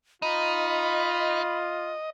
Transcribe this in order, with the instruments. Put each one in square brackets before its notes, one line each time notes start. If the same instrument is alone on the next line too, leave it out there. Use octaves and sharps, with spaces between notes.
[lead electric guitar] D#4 [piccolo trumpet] F4 [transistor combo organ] D#5 [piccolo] B5